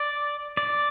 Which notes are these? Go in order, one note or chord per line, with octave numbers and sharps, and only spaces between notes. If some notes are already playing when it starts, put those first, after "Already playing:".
Already playing: D5
D5